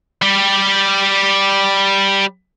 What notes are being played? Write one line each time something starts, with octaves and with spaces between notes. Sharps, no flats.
G3 G4